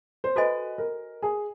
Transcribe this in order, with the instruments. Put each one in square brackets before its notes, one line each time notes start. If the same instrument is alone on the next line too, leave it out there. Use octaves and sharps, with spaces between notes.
[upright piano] C5
[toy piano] F#4 A4 C5 D#5 G#5 [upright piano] B4
[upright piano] A#4
G#4